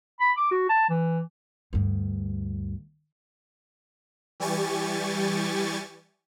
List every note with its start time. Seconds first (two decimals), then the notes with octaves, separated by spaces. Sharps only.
0.20 B5
0.37 D6
0.51 F#4
0.69 A5
0.89 E3
1.73 D2 G2
4.40 E3 G3 G4 G#5 C#6 A6